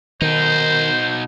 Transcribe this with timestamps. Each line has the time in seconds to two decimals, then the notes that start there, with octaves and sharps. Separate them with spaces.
0.22 B2 D#3 D#4 C5